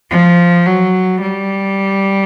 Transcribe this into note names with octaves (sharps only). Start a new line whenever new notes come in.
F3
F#3
G3